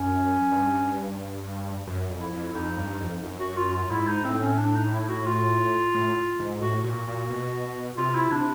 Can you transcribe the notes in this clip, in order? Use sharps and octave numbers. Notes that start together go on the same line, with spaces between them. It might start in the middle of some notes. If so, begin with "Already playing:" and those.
Already playing: F#2 C#4
G2
F#2
F2
E4
F2
F2 D#4
G2
F2
F#2
F#4
F4
F4
G#2 E4
D#4
A2 C4
C#4
D4
D#4
E4
F#4
F4
A2
G#2
A2 F#4
A#2 F#4
A#2
B2
C3 F4
E4
C3 D4